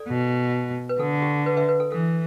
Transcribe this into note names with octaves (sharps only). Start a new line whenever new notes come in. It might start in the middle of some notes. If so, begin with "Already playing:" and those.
Already playing: A4 D5
B2
B4
D3 A4
G4
B4
B4 E5
B4
A4
E3 A4